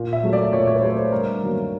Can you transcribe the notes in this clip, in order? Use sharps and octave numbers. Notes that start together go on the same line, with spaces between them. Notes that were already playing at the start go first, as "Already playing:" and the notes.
Already playing: A#2
E5
F#3 A3
D5
A#2 C#5
C#5
B4
F#3 A3 C5
B4
G2 A#4
D#3 F#3 A#3